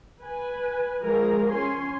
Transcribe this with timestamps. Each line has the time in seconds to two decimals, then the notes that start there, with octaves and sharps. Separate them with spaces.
0.21 B4 G#5
1.04 F3 G#3 G#4 A#4
1.51 C#4 G#5 C6